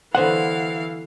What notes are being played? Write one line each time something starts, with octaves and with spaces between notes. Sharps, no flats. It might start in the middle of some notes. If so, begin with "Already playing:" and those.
D3 E3 F#3 B3 C5 F5 F#5